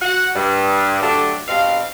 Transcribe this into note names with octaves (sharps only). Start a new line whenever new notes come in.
F#4 F#5
G2
D3 F#3 A3 D4 G4
G2 B2 C4 F5